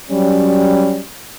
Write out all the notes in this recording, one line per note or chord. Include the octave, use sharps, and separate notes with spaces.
F#3 G3 C#4